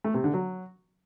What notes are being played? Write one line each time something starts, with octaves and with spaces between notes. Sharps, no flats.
A3
C3
D3
F#3